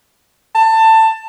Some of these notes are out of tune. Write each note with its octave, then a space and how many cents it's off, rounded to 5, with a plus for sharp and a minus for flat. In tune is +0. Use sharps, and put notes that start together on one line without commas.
A5 +20